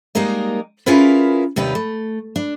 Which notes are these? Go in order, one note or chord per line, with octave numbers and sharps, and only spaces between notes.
G3 G#3 A#3 D#4 A#4 D#5
C#4 E4 F4 G#4 A#4 B4
D#2 C3 G3 D#4 B4
A3
D4